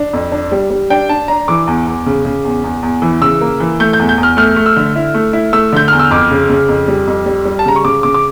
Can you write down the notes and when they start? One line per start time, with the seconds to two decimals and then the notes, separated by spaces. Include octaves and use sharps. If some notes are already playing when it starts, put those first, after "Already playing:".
Already playing: D4
0.13 F2
0.32 D4
0.52 G3
0.70 G3
0.90 D4 G5
1.09 D4 A5
1.28 D4 A#5
1.48 E3 D6
1.67 E2
1.87 E2
2.06 C#3
2.25 C#3
2.45 E2
2.64 E2
2.83 E2
3.02 E3
3.21 C#3 E6
3.41 A#3
3.60 E3
3.80 A3 G6
3.93 G6
3.99 E2
4.09 G6
4.18 E2
4.23 F6
4.37 A3 F6
4.56 A3
4.66 E6
4.77 D3
4.96 E4
5.14 A3
5.33 E4
5.53 A3 E6
5.73 D3 G6
5.88 E2 F6
5.99 E6
6.11 F2 D6
6.31 C#3
6.50 C#3
6.68 F2
6.88 G3
7.07 F2
7.26 G3
7.45 G3
7.59 A5
7.66 C#3 A#5
7.76 C#6
7.85 C#3 D6
8.03 C#3 D6
8.14 D6